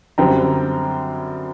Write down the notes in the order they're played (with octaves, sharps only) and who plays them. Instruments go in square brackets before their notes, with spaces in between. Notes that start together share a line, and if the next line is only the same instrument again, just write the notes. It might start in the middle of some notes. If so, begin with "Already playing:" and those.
[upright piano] F#2 D3 G3 C4 G5 A#5